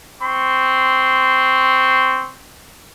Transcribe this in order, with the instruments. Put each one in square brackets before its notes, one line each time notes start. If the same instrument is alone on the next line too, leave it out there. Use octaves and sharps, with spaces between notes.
[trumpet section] C4 C6 C#6